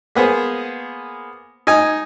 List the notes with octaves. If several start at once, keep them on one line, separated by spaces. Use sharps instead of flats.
A#3 B3 G#4 C5
D#4 D#5 G#5